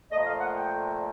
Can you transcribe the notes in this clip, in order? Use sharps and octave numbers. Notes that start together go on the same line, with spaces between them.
A#2 F3 A3 D#5
F5
F#5
G5